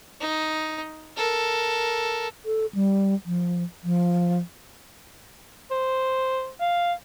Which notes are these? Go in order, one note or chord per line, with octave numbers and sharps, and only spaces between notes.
D#4
A4 A#4
A4
G3
F3
F3
C5
F5